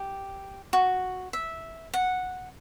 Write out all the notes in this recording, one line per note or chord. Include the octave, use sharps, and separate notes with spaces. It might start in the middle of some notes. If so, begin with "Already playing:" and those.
Already playing: G4
F#4
E5
F#5